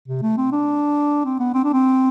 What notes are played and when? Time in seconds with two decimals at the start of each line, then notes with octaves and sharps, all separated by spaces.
0.08 C3
0.22 A3
0.37 C4
0.52 D4
1.25 C4
1.40 B3
1.54 C4
1.64 D4
1.73 C4